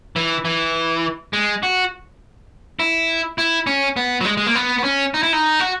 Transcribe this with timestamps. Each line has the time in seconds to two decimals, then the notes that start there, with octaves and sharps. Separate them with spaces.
0.16 E3
0.45 E3
1.33 G#3
1.63 F#4
2.80 E4
3.38 E4
3.67 C#4
3.96 B3
4.21 F#3
4.25 G#3
4.37 G#3
4.47 A#3
4.55 B3
4.79 B3
4.84 C#4
5.14 D#4
5.23 E4
5.33 D#4
5.60 F#4